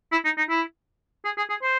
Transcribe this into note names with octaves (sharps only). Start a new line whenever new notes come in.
E4
D#4
D#4
E4
G#4
G#4
G#4
C5